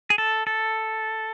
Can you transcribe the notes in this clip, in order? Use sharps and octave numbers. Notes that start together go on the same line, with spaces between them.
G#4
A4
A4